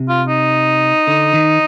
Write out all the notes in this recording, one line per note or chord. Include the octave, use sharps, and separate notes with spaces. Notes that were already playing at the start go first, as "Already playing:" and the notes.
Already playing: C3
F4
D#4
D3
D#3